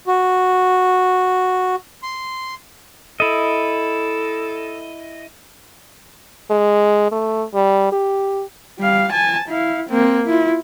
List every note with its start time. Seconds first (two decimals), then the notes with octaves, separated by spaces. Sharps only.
0.07 F#4
2.03 C6
3.20 E4 A4 D#5
6.50 G#3
7.12 A3
7.54 G3
7.92 G4
8.79 G3 F5
9.12 G#5 A5
9.48 E4 F5
9.89 A#3 C4
10.26 E4 F4